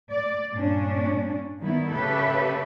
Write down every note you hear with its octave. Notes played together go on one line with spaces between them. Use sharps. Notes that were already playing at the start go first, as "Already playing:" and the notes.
D5
G2 A#2 C#4 D4
D#3 G3 B3 E4
C#3 G4 A4 B4 E5